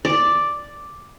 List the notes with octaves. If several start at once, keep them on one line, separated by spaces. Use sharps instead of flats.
D5